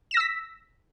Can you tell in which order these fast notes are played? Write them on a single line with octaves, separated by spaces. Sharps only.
E7 A#6 E6 B6